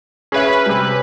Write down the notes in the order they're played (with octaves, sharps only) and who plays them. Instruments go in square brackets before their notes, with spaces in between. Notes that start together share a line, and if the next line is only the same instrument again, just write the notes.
[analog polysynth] C#4 B4 [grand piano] G#4 C#5 E5
[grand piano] C3 G3